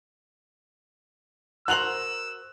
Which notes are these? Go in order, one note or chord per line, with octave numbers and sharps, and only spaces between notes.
F#4 A#4 C5 E6 F#6 F7 F#7